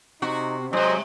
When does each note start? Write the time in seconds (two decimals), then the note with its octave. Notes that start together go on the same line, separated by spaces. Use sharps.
0.22 C3 D#4 F#4
0.73 G#2 C3 F#3 G#3 C5 D#5